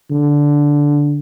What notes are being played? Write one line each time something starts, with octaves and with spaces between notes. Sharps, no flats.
D3